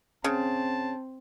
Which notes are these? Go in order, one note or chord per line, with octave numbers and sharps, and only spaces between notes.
C#3 C4 A5